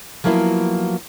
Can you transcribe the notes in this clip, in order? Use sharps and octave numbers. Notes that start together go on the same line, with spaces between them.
F3 F#3 A#3 B3 E4